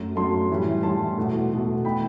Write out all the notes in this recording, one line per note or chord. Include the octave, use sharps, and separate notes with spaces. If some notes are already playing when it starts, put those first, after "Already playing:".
Already playing: F#2 F#3 A3
F#2 F#3 A3 A5 C6
A2 E3 G3
A2 E3 G3 A5 C6
E2 B2 A3
E2 B2 A3
E3 A3 G5 B5